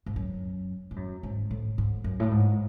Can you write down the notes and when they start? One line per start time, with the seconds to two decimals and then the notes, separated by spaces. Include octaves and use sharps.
0.06 G#2
0.16 F#2
0.91 G#2
0.96 F#2
1.23 G#2
1.51 A2
1.78 G#2
2.04 F#2
2.20 A2
2.31 G#2